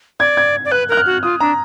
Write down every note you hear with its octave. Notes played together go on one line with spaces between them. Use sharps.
D5 G#6
G#6
D5
B4 F#6
A#4 F#6
F6
F#4
F4 D#6
D4 A#5